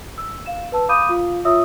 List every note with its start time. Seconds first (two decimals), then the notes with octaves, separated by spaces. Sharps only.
0.18 E6
0.46 F5 E7
0.72 B4 A5 E6
0.89 F5 B5 D6 D#6 G6 D#7
1.09 F4 F5
1.45 F4 C#5 E5 D#6 E6